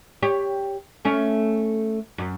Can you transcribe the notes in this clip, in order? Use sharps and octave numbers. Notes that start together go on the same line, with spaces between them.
G4 C#5
A3 C#4
F#2